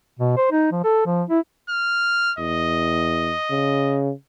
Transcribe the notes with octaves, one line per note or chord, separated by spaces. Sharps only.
B2
C5
D#4
F3
A4
F3
E4
F6
E2 D#5
C#3